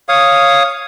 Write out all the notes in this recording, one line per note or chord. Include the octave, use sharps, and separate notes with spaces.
C#5 F5 D#6